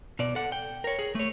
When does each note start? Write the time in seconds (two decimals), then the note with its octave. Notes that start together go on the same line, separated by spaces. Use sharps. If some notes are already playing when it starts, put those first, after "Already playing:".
0.19 B2 D5
0.35 A4 F#5
0.52 G5
0.84 A#4 C#5
0.99 G#4
1.15 A3 C#5